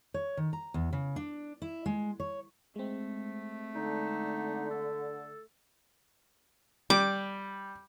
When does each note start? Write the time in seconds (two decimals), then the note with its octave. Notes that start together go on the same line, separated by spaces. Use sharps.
0.14 C#5
0.37 D#3
0.53 A#5
0.74 E2
0.93 C#3
1.16 D4
1.62 E4
1.86 G#3
2.20 C#5
2.76 G#3 A3 C4
3.75 D3 D#4
4.71 A4
6.90 G3 D6